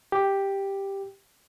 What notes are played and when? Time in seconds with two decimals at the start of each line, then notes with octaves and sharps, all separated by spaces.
0.12 G4